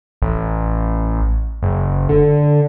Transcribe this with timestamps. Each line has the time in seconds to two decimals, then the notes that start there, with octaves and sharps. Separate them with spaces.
0.22 A1
1.62 F#1
2.09 D3